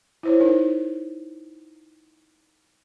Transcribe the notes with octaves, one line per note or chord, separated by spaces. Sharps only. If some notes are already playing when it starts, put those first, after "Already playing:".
E4 C5 C#5
D#4 A#4 C5